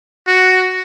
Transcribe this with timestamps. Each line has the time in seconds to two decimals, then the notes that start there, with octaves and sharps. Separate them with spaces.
0.27 F#4